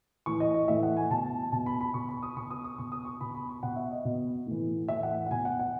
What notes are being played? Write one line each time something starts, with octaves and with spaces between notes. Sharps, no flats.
A2 E3 C#6
D#5
D#5
A2 E3 E5
F#5
G#5
B2 A5
B2 A5
B5
B5
B2 C#6
B5
D#6
B2 C#6
D#6
D#6
B2 C#6
D#6
C#6
B2 B5
B5
C#6
B2 F#5
E5
D#5
B2
A2 E3
A2 E3 E5
F#5
F#5
B2 G#5
F#5
F#5